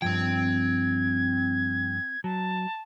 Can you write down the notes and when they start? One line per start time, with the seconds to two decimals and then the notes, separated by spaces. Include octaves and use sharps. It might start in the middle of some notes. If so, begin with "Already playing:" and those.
0.02 G2 F3 C4 G5 G#6
2.24 F#3 A5